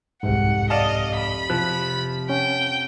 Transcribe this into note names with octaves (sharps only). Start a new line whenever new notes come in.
F1 C2 G#2 F#5 C#7 D7
D5 D#5 F5 A5
B5
C3 F3 F#6
C#4 F#5 G5